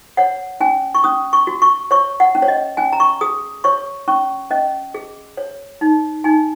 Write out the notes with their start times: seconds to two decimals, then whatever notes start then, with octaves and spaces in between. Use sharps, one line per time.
0.17 C#5 F#5
0.60 C#4 G#5
0.95 C#6
1.04 C#4 D#6
1.33 C#6
1.47 F#4
1.62 C#6
1.91 C#5 C#6
2.20 F#5
2.35 C#4
2.42 C#5
2.48 D#5
2.77 C#4 G#5
2.93 A#5
3.00 C#6
3.21 G#4 D#6
3.64 C#5 C#6
4.08 C#4 C#6
4.51 C#4 D#5
4.94 G#4
5.37 C#5
5.81 D#4
6.24 D#4 G#5